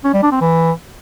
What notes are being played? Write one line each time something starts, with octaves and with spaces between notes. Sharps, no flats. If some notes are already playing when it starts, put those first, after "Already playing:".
C#4
G3
D4
C4
E3